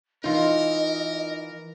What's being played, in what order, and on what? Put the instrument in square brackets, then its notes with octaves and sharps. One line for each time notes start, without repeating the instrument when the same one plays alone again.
[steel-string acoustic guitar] E3 A#3 [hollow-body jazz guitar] D#4 F4 [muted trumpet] A#4 [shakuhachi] D#5